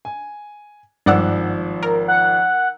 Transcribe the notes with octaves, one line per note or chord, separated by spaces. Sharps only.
G#5
G#1 G2 F3 D5 F#5 E6
A#4
F#5